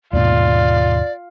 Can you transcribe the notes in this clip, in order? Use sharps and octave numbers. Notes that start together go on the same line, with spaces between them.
D#2 G#2 B2 F4 D5